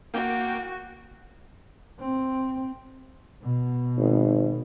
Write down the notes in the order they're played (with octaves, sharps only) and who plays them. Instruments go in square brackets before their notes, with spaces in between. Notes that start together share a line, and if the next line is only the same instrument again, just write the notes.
[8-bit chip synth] A#3 G5 [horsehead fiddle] F#4
[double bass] C4
[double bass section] B2
[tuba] G#1